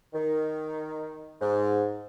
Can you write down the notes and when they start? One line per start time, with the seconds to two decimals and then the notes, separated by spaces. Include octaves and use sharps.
0.14 D#3
1.41 G#2